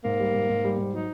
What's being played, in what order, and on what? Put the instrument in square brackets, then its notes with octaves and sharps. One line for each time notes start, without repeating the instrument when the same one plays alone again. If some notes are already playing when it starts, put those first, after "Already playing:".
[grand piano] G#2 [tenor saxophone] A#3
[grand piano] G3
G#2
G#2
G3
G#2
[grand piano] F#3 [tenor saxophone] D#4